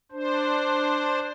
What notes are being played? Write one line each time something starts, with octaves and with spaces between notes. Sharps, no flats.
D4 C5